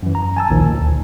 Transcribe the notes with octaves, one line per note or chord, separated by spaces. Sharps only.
F#2 E3
A#5
G#5 A5 E6
A1 D#2 A#2 D#3 F3
D2